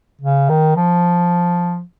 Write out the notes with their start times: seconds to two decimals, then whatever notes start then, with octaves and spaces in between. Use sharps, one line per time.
0.22 C#3
0.50 D#3
0.76 F3